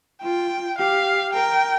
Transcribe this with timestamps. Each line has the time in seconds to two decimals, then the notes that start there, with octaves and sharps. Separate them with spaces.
0.22 F4 G5
0.77 G4 F5
1.33 A#4 G5